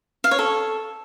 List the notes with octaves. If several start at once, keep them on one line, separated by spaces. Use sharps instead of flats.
F5
C#5
A4